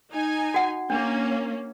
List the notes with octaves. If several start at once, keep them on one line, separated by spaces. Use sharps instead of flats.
D#4 G#5
F#4 F#5
A#3 C#4 D4